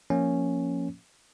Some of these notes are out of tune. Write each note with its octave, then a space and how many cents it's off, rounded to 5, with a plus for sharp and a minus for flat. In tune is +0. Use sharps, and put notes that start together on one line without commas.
F3 +0 A#3 +0 C#4 +0